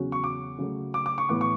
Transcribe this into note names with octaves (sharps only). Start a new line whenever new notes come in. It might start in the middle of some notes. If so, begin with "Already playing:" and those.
Already playing: E2 C#3 F#3 C#4 F#4
C#6
D6
C#3 F#3 A3
D6
D6
C#6
A2 E3 B3 D6
C#6